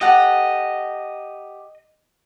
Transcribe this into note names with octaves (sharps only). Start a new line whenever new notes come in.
G4 A4 D#5 F#5